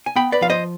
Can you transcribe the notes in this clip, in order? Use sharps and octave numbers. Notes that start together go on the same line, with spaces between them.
G#5
B3 G5 B5
B4 D5
F3 F5
C5 D#5